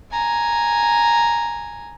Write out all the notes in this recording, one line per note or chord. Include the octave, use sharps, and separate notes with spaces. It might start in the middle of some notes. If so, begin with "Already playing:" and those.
G#5 A#5